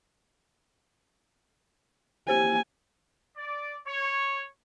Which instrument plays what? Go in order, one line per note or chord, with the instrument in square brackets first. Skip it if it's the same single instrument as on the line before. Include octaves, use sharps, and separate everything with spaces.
[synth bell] A#3 G4 C5 [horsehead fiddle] G#5
[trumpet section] D5
C#5